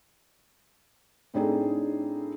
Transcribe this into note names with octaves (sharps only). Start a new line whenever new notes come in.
A2 C4 D4 D#4 G#4 A4